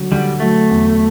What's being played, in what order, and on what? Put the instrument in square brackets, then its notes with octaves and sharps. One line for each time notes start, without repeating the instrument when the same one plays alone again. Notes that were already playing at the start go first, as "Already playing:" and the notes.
Already playing: [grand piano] D3 F#3
[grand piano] D3 [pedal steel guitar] G3
[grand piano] F#3 [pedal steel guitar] A3
[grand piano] E2